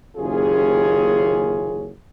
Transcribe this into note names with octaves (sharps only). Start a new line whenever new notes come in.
F#1 D#2 C3 C#4 F4 G#4